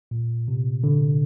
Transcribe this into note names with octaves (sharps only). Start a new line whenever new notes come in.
A#2
C3
D3